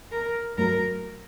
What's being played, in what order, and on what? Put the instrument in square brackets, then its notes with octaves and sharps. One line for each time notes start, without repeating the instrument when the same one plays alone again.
[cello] A#4
[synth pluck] G2 F#3 A3 D4 F#4 [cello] A#4